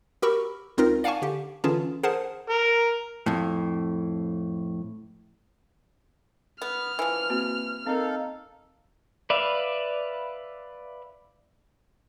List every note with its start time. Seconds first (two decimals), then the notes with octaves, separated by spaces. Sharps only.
0.22 F#4 G4 A#4 B5 C#6 E6
0.78 C#2 C4 D#4 F4 A#4 A#6
1.04 D5 F5 F#5 G#5 A5 C#6
1.22 D3 G4
1.64 D3 E3 C#4 F4 G#4 A5
2.03 G#4 A#4 C5 F#5 A5
2.50 A#4
3.26 F2 A2
6.62 B3 F6
6.99 E3 F3
7.30 A#3 C4 F#4
7.86 C4 D#4 A4 A#4 F5
9.30 B4 D5 E5 F5